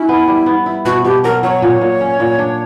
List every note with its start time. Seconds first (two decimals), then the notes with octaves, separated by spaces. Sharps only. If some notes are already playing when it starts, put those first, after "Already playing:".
Already playing: C#4 E4
0.09 B3
0.28 G3
0.46 B3
0.66 E4
0.85 B2 F#4
1.04 B2 G4
1.24 F#3 A#4
1.43 F#3 C#5
1.62 A#2
1.81 A#2
2.01 C#4
2.20 A#2
2.39 D4